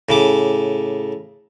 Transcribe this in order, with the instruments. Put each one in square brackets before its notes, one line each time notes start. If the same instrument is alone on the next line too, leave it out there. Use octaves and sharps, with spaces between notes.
[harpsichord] A2 C#3 D6